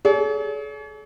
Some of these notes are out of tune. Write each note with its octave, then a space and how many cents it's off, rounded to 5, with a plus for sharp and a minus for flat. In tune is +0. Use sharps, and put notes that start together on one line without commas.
G#4 +45 C#5 +45